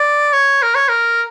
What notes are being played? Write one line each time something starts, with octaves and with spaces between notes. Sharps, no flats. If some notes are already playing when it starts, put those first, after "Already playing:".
Already playing: D5
C#5
A#4
C#5
A#4